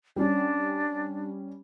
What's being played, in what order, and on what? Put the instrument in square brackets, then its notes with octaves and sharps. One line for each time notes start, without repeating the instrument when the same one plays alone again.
[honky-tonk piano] G3 C#4 [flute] D4